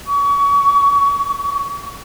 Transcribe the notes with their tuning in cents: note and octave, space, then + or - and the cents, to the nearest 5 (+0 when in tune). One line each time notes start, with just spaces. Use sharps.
C#6 +35